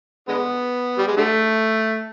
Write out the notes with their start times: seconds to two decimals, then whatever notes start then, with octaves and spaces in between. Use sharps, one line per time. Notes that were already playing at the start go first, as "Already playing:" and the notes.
0.28 D3 G#3 B3
0.98 G3
1.08 G#3
1.17 D3 A3